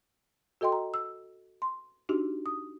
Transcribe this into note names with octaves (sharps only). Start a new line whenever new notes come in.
F#4 A4 D#5 G5 C6
A#5
E6
C6
D4 D#4 F#4 G4
D#6